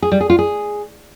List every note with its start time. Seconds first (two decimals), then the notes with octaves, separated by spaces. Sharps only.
0.02 G#4
0.12 G3
0.21 G#4
0.30 F4
0.39 G#4